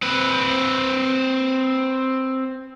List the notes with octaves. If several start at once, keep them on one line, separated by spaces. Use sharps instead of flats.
C4 B4